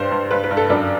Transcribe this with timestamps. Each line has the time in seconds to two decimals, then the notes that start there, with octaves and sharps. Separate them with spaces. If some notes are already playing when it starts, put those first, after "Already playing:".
Already playing: G2 G3 C5
0.11 G2
0.31 G2 B4
0.44 B4
0.51 G2
0.57 A4
0.70 F#2 D4